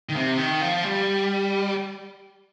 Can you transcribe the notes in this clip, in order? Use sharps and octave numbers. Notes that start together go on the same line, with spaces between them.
D#3
C3
D#3
F3
G3